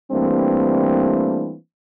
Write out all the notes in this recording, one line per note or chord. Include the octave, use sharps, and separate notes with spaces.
E3 G3 A3 A#3 C4 D4